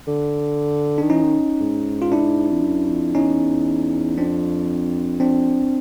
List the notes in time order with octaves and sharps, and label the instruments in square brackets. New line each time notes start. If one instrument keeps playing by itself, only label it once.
[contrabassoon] D3
[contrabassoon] D#3 [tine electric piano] D4
[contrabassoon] E3 [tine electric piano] C#4 D#4
[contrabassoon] D#3
G#2
[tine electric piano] F4
D4 E4
[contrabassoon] F2
F#2
F2
[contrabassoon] E2 [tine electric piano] C#4 D#4
[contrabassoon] F2 [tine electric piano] C4 D4
[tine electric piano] C4 D4